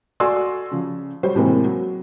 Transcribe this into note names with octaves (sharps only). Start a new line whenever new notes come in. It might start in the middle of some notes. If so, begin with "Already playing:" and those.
F#4 A4 D5 G#5 C6 E6
C#3 F3
F#3 G3 C5 C#5
A2 C3 E3 G#3 A#3 C4
F#3